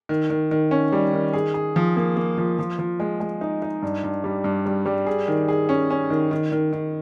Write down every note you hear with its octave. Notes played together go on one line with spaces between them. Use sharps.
D#3
D#3
D#3
C#4
G3
D#3
G#4
G#4
F3
A#3
A#3
F3
F3
F3
G#3
G#3
D#4
D#4
G2
G2
G3
G2
G3
G3
G#4
D#3
G#4
C#4
C#4
D#3
D#3
D#3
D#3